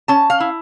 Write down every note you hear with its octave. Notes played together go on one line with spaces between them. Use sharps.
C#4 A5
F5
E4